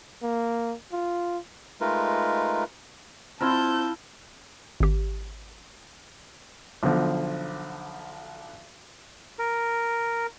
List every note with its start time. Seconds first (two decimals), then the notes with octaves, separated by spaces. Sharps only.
0.23 A#3
0.92 F4
1.81 G#3 A3 D#4 F4 A#4 B4
3.41 C4 E4 F4 A#4 A5 G6
4.80 G#1 G4
6.83 B1 D3 F3
9.39 A#4